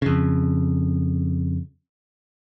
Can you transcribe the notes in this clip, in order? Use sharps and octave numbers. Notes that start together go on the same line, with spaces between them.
F2 C#3